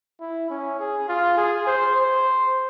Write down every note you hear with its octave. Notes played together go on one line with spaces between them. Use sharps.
E4
C#4
G#4
F4
G#4
C5
C5